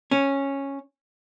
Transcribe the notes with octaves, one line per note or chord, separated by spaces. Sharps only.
C#4